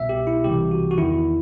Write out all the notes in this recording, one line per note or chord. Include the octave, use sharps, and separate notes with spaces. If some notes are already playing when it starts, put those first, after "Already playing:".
Already playing: C2 B2 E5
G4
E4
C2 C3 E3 G4
F#4
F#4
E2 D#3 E4